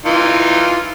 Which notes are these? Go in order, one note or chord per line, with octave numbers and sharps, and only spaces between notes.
E3 D#4 F4